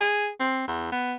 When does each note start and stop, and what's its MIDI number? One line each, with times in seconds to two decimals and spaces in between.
0.01 0.29 68
0.40 0.63 60
0.67 0.88 40
0.92 1.16 59